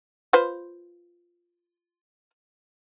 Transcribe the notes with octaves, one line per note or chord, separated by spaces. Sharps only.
F4 B4 C5